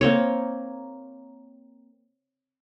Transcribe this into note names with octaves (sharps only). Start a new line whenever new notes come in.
A#3 C4 C#5